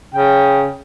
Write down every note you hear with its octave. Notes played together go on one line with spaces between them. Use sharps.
C#3 G5